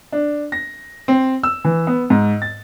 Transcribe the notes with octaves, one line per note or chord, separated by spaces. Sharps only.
D4
A#6
C4
E6
E3
B3
G#2
A6